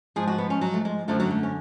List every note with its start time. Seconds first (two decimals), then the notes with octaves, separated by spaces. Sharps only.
0.16 G#2 F3 G#4
0.27 F#4
0.38 B3
0.50 C#4
0.61 F#3
0.74 A3
0.85 G#3
1.08 F#2 D3 F3 A3
1.20 F#3
1.30 A3
1.43 C#4